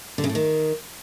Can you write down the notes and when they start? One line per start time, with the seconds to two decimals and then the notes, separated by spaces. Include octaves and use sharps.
0.18 D3
0.24 C#3
0.29 A2
0.35 D#3